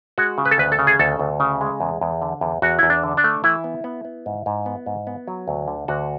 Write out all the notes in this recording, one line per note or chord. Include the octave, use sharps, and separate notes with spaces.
G#3 F#4
C#3
B4
A4
D2 B4
A4
C#3
G#4
D2 A4
D2
C#3
G#3
E2
E2
D3
E2
E2 F#4
E2 E4
D4
D3
D4
A3
E3 E4
B3
B3
B3
G#2
G#2
B3
G#2
B3
F#3
D2
D3
D2 F#4